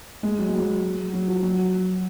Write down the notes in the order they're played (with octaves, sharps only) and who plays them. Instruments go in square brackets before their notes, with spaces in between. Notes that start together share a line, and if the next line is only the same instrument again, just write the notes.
[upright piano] G#3
F#3
G#3
F#3
F#3
F3
F#3